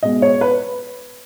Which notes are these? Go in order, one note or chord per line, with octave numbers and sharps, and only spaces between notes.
B2 G#3 D#5
C#5
B4